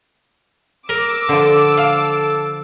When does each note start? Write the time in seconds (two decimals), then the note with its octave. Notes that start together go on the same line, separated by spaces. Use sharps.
0.89 A#4 D6 E6
1.29 D3 F3 A4
1.78 F5